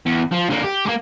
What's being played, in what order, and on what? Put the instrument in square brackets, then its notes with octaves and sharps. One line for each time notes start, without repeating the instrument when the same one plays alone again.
[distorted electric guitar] E2
F3
D3 A#3
G4
G#3 A#3